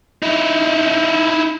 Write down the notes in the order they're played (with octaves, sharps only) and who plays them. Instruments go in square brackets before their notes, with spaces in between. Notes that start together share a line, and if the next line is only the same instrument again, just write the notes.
[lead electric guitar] D#4 E4